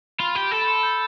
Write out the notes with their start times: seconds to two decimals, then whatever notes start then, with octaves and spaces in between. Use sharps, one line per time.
0.19 F4 B5
0.35 G4
0.51 A4
0.62 B5
0.67 C6
0.83 G6